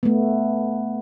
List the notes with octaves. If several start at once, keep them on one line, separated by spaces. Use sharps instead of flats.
A3 B3